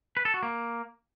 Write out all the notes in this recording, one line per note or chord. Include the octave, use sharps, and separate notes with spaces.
B4
A4
F#4
A#3